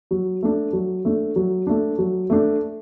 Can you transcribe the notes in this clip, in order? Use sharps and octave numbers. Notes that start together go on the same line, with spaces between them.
F#3
A3 D4
F#3
A3 D4
F#3
A3 D4
F#3
A3 D4